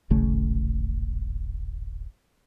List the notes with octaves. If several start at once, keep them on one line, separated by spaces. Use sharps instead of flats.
D1 G#1 C#3 A3